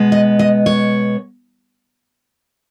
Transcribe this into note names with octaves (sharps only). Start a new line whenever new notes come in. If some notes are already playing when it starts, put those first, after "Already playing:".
Already playing: B2 G#3 B3
D#5
D#5
C#5